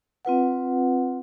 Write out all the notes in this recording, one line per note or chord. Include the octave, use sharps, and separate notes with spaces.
C4 F4 B4 F#5